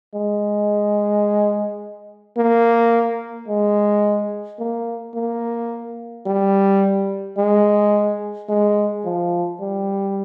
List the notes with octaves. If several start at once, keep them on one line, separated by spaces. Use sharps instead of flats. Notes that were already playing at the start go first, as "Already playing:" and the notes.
G#3
A#3
G#3
A#3
A#3
G3
G#3
G#3
F3
G3